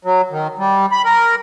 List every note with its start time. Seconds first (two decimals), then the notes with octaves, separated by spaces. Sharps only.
0.05 F#3
0.31 D#3
0.58 G3
0.92 B5
1.05 A#4